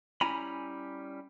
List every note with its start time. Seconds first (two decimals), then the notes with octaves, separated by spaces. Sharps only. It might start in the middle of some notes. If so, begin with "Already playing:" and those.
0.21 G3 C#4 E4 G#5 A#5 B5